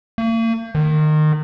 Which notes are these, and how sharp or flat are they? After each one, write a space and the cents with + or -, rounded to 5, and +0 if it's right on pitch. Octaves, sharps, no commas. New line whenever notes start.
A#3 -45
D#3 -25